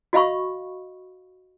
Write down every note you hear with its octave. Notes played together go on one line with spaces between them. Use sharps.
F#4 D#5 F5 B5 C#6